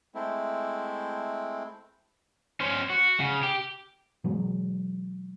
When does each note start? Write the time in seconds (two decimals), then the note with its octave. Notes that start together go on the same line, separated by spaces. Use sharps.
0.15 G#3 A3 C4 E4
2.60 C#4 C5
2.90 F#4
3.20 C#3
3.43 G4
4.24 B2 E3 F#3 G#3